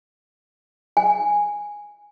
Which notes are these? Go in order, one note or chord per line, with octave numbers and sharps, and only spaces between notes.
G#5